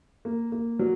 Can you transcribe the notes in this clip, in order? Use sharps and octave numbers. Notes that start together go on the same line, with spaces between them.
A#3
A#3
F#3